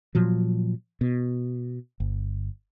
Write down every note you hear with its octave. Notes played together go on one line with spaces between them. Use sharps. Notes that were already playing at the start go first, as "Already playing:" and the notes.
A#2 F3 F#3
B2
G1